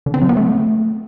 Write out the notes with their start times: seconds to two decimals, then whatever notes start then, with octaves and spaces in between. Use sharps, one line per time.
0.06 D3
0.14 C4
0.22 F#3
0.29 B3
0.37 A3